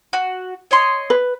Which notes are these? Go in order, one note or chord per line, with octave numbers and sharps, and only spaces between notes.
F#4
C#5 D#5 C6
B4